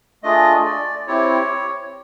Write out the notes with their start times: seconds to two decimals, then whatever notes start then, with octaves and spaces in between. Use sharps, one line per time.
0.23 A3 D4 F4 G#4 D#5
0.65 D5
1.07 C4 E4 G4 C#5